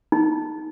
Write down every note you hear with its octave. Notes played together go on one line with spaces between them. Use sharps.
D#4